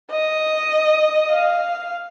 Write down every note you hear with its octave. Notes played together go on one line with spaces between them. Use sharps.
D#5
F5